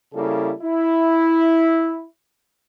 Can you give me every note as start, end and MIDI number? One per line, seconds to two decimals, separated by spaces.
0.13 0.52 49
0.13 0.52 55
0.13 0.52 58
0.13 0.52 64
0.13 0.52 69
0.61 2.05 64